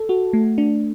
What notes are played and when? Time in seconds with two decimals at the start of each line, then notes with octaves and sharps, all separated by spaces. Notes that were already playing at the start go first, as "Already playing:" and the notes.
Already playing: A4
0.09 F#4
0.33 A3
0.58 D4